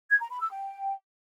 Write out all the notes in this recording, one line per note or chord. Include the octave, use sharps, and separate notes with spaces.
G#6
A#5
B5
E6
G5